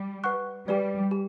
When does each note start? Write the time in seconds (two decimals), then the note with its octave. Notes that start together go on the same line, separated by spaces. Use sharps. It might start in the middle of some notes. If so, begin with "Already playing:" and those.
Already playing: G3
0.24 B4 F#5 C#6 F#6
0.68 G3 G4 B4 D5
1.11 G4